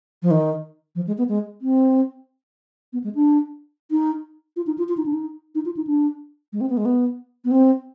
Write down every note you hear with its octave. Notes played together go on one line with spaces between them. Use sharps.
F3
D#3
F3
G#3
B3
G#3
C4
B3
G#3
D4
D#4
F4
D#4
F4
F4
D#4
D4
D#4
D#4
F4
D#4
D4
G#3
C4
B3
G#3
B3
B3
C4